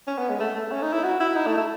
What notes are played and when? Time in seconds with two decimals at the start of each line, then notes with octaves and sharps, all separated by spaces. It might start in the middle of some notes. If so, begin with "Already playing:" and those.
0.07 C#4
0.18 B3
0.29 G#3
0.40 A3
0.55 A3
0.72 C#4
0.82 D#4
0.93 E4
1.04 F#4
1.20 E4
1.36 D#4
1.47 A3
1.57 A3